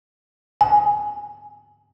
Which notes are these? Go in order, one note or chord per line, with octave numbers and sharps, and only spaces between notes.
G#5